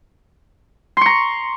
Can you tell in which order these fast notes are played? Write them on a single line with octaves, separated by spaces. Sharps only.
C6 C#6 A#5